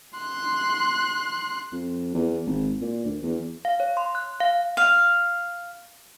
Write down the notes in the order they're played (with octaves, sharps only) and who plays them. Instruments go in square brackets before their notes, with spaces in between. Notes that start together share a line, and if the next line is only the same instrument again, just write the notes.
[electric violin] C6 F#6
[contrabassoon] F2
E2
G#1
A#2
D2
E2
[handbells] F5
C#5
C6
F#6
F5
[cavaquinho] F5